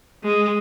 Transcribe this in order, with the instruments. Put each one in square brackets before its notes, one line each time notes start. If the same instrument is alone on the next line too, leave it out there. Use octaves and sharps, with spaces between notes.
[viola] G#3